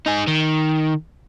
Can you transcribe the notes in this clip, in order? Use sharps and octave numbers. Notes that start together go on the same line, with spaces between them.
D#4 G#4
D#3